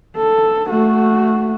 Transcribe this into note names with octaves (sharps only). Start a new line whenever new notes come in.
A4
A3 F#4